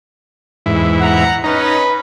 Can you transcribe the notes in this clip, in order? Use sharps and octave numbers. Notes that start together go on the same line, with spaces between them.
E2 G#2 E4
F#5 A#5
C#4 D#4 B4 A#5